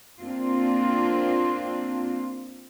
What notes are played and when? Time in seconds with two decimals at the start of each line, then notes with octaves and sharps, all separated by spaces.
0.20 A#3 C4 D4 F4